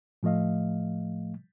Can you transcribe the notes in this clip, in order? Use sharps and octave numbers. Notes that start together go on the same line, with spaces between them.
A2 F3 A3 D#5 F5